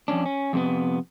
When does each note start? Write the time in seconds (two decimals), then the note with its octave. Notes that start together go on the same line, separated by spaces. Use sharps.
0.08 F2 G#2 C#4 D4
0.26 C#4
0.53 F2 C3 B3